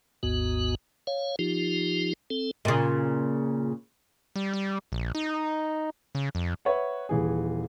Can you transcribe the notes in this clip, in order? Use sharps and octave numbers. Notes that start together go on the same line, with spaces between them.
G#1 D#2 G#2 B3 F#4
C#5 F5
F3 D#4 F4 G4
C4 A4
A#2 C#3
G3
G3
A#1
D#4
C#3
F2
B4 C#5 E5 F#5
D#1 E3 G#4